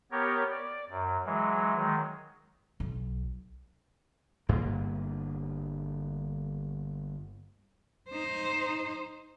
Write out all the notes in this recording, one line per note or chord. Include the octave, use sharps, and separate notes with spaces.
B3 G4 A#4 C#5
D5
F#2
E3 F#3 G#3
D#3 F#3 G#3
B1
G1 G2 A#3
D#4 C5